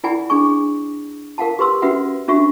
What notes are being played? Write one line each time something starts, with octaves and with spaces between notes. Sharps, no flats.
E4 D5 F#5 G#5 B5
D4 G#4 G#5 C#6
A#4 F5 F#5 A5
G4 B4 C6 E6
C#4 F#4 B4 E5 F#5
C#4 D4 F#4 E5 C#6